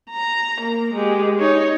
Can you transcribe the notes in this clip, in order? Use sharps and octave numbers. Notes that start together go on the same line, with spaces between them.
A#5
A#3
G#3 G4
D#4 C#5